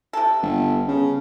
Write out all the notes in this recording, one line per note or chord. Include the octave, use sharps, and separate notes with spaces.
C3 A4
G1
C#3